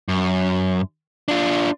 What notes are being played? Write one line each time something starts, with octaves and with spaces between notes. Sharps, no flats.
F#2
D4 F4